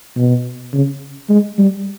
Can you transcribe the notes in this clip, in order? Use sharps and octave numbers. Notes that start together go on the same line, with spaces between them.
B2
C#3
G#3
G3